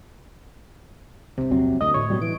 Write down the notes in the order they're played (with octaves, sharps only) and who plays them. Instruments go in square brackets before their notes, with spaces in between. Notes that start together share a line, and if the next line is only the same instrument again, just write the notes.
[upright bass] E2 G2 [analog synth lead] C3
[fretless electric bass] A#1 F#3 C4 [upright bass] E2
[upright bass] E1 B3 [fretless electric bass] D2 [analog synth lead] D#5
[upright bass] A2 [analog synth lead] C#5
[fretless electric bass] B2 F#3 G3
[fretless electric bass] E3 [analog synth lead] D7